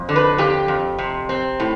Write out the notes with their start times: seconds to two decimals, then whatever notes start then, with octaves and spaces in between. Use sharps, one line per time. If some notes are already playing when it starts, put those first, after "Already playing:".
Already playing: F2
0.09 D3
0.16 B4
0.38 F2 G4
0.68 F2
0.98 C3
1.29 C4
1.60 A2